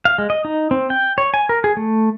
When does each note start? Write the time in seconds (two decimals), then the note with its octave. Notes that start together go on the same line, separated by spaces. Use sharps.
0.05 F5
0.18 G#3
0.30 D#5
0.45 D#4
0.71 C4
0.90 G5
1.18 C#5
1.34 G#5
1.49 A#4
1.64 G#4
1.77 A3